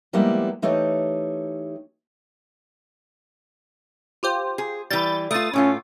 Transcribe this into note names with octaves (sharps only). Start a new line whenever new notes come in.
F3 G3 G#3 A#3 B3 E4
E3 A3 D#4 G4 C#5
F4 G4 C5
G#4
E3 G3 G6 A6
A3 F4 D#6 A6
A2 A3 C#4 F4 C#5